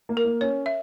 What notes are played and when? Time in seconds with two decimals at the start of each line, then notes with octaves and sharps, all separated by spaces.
0.09 A#3
0.17 A#4
0.25 A#3
0.41 C#4 C#5
0.66 E5